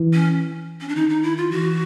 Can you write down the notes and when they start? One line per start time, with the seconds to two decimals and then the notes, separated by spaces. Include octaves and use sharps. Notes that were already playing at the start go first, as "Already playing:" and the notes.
Already playing: E3
0.14 C#4
0.81 C#4
0.88 D4
0.95 D#3 D#4
1.09 D#4
1.23 E4
1.37 F4
1.50 E3 F#4